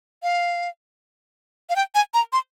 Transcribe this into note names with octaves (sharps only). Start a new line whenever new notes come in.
F5
F5
G5
G#5
A#5
C6